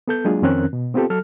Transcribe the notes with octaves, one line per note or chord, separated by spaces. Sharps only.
B3 A4 G6
F#3 G#3 A#3 D4 F4 G#4
F2 D#3 C4 C#4 A#4 F#6
B2
B3 C4 F4 G4 A4
F#3 A4 F6